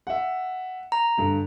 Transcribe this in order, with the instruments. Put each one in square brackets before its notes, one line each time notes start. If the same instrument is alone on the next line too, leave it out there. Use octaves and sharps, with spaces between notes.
[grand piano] E5 F#5
[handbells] A#5
[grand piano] G2 D3